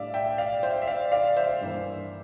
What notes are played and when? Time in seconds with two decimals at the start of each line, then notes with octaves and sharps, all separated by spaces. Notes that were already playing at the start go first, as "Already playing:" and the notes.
Already playing: A2 G3 D4 D5 E5 F5
0.14 E5 G5
0.38 D5 F5
0.63 C5 E5
0.82 E5
0.87 D5 F5
1.12 D5 F5
1.36 C5 E5
1.61 G2 E3 A#3